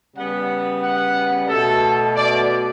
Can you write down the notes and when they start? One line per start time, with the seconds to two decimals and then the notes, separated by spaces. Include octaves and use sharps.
0.15 C#3 G3 B3 F#5
0.82 F#5
1.48 B2 A3 A4
2.16 D5